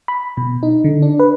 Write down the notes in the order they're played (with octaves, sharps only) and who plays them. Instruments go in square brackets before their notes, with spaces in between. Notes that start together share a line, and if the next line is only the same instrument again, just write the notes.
[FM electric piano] B5
B2
D#4
D3
D4
B4